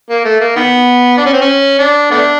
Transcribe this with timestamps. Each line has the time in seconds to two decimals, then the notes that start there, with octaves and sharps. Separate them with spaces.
0.10 A#3
0.25 A3
0.40 A#3
0.56 D#3 B3
1.18 D4
1.26 C#4
1.33 C4
1.41 C#4
1.79 D4
2.11 A3 B3 D4